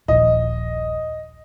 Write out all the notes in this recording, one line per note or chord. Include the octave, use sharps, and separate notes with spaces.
D#1 A#1 D#5